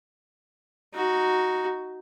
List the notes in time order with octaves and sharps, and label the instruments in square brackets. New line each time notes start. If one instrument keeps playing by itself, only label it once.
[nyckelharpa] D#4 F#4